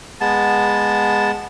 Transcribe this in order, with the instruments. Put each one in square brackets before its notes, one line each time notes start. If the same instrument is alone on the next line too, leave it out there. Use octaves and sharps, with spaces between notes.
[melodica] G#3 B3 A5